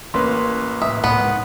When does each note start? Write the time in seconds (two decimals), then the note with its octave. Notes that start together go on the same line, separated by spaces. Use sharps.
0.14 A1 A#3 C#4 B4 C6
0.82 A2 E5 D#6
1.04 A2 B3
1.19 G#2